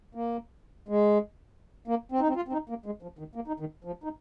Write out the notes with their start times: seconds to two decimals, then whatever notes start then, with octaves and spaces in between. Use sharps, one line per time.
0.15 A#3
0.88 G#3
1.88 A#3
2.12 C4
2.20 D#4
2.28 C4
2.36 F4
2.48 C4
2.53 D#4
2.69 A#3
2.86 G#3
3.02 F3
3.19 D#3
3.35 A#3
3.47 D#4
3.60 D#3
3.84 F3
4.04 D#4